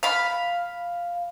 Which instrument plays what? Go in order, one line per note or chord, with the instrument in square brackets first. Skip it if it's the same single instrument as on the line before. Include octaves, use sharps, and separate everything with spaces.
[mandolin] F5 B5